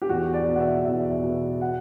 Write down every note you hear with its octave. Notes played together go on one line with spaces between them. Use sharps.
G4
E2 F#4
D5
B2
F#5
E5
E2 E5
B2
F#5